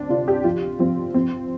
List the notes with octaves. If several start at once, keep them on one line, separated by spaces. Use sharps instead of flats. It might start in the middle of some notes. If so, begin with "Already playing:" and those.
Already playing: D2 C4 D4
C3 F4
G4
F3 F4
F3 C4
F3 C4